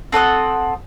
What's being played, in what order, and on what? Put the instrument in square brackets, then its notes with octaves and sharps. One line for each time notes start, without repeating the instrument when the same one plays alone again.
[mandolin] C4 A4 F#5 D#6